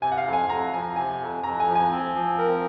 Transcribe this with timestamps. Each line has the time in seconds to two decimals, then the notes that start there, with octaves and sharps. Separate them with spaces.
0.02 C3 G#5
0.12 F#5
0.18 F5
0.26 F2
0.33 G#5
0.49 F2 A#5
0.73 F3 G#5
0.96 C3 G#5
1.21 F2
1.43 F2 A#5
1.60 G#5
1.68 F3
1.75 G#5
1.91 C4
2.15 F3
2.38 A#4